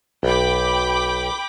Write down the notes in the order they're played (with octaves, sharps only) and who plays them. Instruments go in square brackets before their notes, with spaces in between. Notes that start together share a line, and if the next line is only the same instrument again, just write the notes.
[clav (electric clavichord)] B1 [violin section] G5 B5 D6